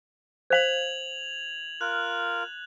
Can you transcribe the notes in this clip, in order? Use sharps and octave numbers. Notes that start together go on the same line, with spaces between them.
C5 F5 G#6 F7 F#7
F4 A#4 F#6